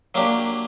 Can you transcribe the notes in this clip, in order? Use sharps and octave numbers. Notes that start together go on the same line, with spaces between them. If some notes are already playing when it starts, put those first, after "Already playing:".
F#3 A#3 D4 G4